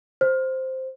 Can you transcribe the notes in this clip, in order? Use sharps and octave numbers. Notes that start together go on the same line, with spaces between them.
C5